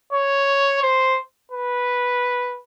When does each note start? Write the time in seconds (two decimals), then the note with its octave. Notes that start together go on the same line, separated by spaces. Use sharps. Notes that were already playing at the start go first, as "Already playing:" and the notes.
0.13 C#5
0.83 C5
1.52 B4